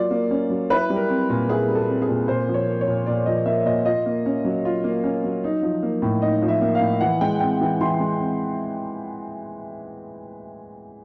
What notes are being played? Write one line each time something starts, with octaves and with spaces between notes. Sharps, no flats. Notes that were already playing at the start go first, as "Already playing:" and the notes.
Already playing: F#3 A#3 F4 D5
A#3
C#4
F#3
E4 B4
G3
A#4
C4
A#2
E4 G#4
G3
A4
C4
G#4
A#2
A#2 C5
F3
C#5
A#3
C#5
A#2
A#2 D5
F3 D#5
A#3 E5
A#2 D#5
F4 D#5
A#3
C#4
F#3
F4
A#3
C#4
F#3
D#4
F3
A#3
A2
D#4 D#5
F3
E5
A#3
F5
A2
E3 F#5
G#3 G5
C4 G5
E3
E3 C6
G#3
C4